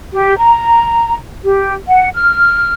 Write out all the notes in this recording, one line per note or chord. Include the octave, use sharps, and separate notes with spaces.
G4
A#5
G4
F#5
F6